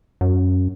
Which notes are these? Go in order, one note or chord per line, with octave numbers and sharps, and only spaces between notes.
F#2